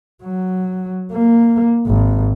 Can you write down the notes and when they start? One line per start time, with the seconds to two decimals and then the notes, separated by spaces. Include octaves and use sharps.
0.23 F#3
1.12 A#3
1.87 G#1